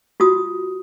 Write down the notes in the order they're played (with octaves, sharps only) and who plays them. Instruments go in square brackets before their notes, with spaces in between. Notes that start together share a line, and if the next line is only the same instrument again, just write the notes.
[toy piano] F4 F#4 D#6